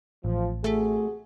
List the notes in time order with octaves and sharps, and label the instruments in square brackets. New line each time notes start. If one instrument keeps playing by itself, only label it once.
[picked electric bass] A1 [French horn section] F3
[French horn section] C3 F#4 G#4 [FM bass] A3